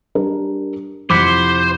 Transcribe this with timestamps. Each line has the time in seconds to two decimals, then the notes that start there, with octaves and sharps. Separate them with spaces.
0.15 G3 D4 A#4
1.10 F2 C3 E4 C5 F#5 B5 D6